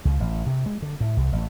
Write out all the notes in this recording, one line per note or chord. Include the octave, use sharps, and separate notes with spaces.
C#2
A1
C3
G#3
D3
A2
C2
A1